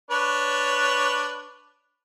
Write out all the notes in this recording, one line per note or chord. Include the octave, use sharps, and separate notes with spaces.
D4 B4 C#5